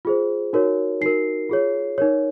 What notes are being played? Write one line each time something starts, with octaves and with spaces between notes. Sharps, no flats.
F4 G#4 C5
D#4 F#4 A#4 C#5
D#4 F#4 A#4 C7
F4 G#4 C#5
D#4 A#4 C#5